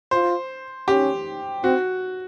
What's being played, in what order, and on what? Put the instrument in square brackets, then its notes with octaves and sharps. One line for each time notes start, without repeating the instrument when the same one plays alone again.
[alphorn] F4 [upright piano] C5
[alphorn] C#4 [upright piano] G4
[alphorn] C4 [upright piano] F#4